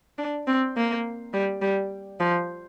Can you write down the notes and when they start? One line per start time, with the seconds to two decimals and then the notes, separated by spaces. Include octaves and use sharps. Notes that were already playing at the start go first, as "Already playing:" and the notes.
0.18 D4
0.47 C4
0.77 A#3
1.34 G3
1.62 G3
2.20 F3